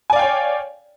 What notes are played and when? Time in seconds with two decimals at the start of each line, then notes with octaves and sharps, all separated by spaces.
0.10 G#5
0.13 D5
0.16 F5
0.19 G5
0.22 C#5